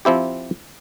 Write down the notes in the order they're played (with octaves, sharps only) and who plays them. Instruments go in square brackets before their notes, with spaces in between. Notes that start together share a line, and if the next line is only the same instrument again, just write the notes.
[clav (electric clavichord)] F3 C4 E4 G4